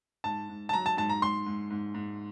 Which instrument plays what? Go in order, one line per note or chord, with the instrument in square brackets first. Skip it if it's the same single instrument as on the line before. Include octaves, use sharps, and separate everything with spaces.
[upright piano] G#2 [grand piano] A5
[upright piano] G#2
[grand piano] A5
[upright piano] F#3 [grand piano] A#5
[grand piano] A5
[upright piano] G#2 [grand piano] A5
[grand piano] A#5
[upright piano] G#2 [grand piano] C6
[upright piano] G#2
G#2
G#2